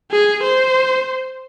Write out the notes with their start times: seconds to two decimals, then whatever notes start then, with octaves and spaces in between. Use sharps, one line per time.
0.12 G#4
0.44 C5